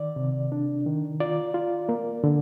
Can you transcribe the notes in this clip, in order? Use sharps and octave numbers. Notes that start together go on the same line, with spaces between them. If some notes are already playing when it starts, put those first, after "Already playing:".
Already playing: D#3 D5
C3
D4
D#3
F4 D5
F4
A#3
D3